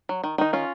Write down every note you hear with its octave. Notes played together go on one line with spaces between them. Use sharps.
F#3
D#3
D#3 D#4
C#4 F4